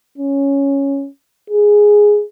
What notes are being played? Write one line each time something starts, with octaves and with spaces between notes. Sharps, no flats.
C#4
G#4